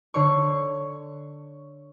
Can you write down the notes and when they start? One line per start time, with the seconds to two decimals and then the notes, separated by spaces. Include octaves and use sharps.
0.14 D3 C#5 C#6